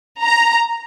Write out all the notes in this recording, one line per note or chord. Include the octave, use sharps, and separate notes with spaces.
A#5